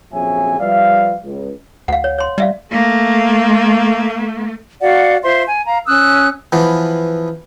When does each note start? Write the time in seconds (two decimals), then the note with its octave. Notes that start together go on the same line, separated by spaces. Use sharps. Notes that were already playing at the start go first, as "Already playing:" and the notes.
0.12 A#1 F2 C#3 F#3 E5 G#5
0.59 F3 G3 B4 D5 E5 F5
1.23 C#2
1.88 D2 F5 F#5
2.04 C#5
2.18 C#5 C6
2.38 G3 D5 E5 F5
2.72 A3 A#3
4.81 F#4 D5 F5 F#5
5.23 F4 C5 E5 C6
5.46 G#5
5.66 F5 A#5
5.86 C#4 D#6 E6 F#6
6.52 E3 F3 B3